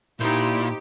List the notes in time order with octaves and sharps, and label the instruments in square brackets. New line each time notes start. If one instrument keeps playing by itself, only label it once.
[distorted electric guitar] A#2 [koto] D#4 C5 [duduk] E4 [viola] G4